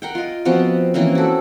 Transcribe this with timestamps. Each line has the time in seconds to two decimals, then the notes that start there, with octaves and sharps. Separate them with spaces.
0.02 A#4 F#5 G5
0.15 F4 D#5
0.45 F3 B3 C4 F#4
0.94 E3 A#3 C4 C#4
1.15 F#4 A4